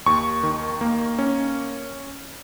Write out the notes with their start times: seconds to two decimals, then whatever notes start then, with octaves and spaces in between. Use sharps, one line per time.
0.06 D#2 C#6
0.43 D#3
0.81 A#3
1.19 C#4